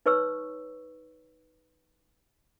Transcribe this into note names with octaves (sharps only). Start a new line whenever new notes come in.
D#4 B4 C#5 C#6 E6